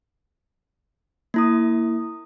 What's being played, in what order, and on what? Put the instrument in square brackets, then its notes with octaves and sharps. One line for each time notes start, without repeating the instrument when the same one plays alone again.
[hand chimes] A#3 E4 D#6